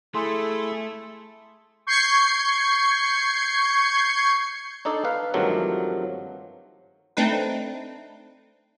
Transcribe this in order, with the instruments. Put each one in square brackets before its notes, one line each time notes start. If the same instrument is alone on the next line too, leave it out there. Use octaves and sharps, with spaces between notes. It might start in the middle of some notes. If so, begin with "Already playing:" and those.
[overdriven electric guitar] A3 [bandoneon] E4 G#4 A4 [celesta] C6
[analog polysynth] C#6 G6 G#6 C7 C#7
[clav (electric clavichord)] D4 D#4 A4 D5
B4 F5
G2 D#3 F3 F#3 A3 C4
[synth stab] A3 C4 D4 D#4 B4